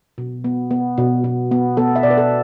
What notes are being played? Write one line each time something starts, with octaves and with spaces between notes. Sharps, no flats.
B2
B3
B3
B2
B2
B3
B3 A4
E5
B2 D5
B4
A4